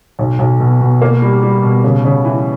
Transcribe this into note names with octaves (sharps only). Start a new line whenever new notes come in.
B1
B1
B2
B2
A#3
G3
G3
B2
C#3
C#3
E3